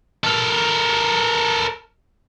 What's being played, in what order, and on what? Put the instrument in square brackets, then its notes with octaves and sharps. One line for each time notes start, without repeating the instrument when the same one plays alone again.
[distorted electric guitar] A4 A#4